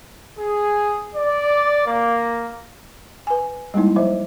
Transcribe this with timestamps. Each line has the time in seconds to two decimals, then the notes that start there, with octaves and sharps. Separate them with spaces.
0.38 G#4
1.14 D5
1.86 A#3
3.27 B4 G#5
3.74 G3 G#3 A#3 D#4 E4
3.96 F3 F#3 C5 E5